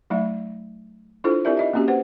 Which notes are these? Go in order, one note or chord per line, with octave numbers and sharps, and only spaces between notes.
F#3 A3 D#4 E5
D4 E4 F4 G#4 A4 C5
C4 E4 G4 A#4 D5 E5
D#4 D#5 E5
A#3 C4 C#4 F#4 G4
B4 C5 F#5